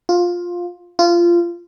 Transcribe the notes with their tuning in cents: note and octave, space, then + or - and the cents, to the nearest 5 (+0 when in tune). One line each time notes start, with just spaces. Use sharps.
F4 +10
F4 -20